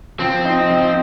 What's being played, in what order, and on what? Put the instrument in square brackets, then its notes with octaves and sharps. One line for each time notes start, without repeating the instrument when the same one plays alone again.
[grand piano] F3 [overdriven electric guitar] C4
[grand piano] D#4
F3